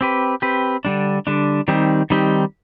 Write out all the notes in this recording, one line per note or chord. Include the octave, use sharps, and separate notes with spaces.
C4 G4 B4
C4 G4 B4
D3 G3 D4
D3 G3 D4
D#3 G3 C4 D#4 G4
D#3 G3 C4 D#4 G4